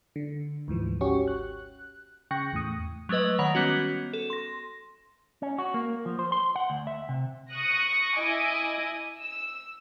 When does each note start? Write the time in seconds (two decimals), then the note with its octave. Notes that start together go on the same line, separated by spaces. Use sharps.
0.16 D3
0.68 D2 G#2 E3 F3
1.01 G#1 C#4 F#4 G4 C#6
1.28 F#6
2.31 C#3 G5 C#6 F#6 A#6 C#7
2.53 E2 A2 D#6
3.09 F#3 G#3 A3 B4 D#5
3.39 D#3 C#5 F#5 B5 A#6 F7
3.55 G3 B3 C#4 F#4
4.13 A4
4.30 C6 A#6
5.42 C#4
5.58 F#4
5.74 A#3
6.06 F3
6.19 C5
6.32 C6
6.56 F#5
6.70 D2
6.87 E5
7.09 C3
7.50 C#6 D#6 F#6 A#6
8.14 E4 D#5 G#5 D6 D#6
9.20 E6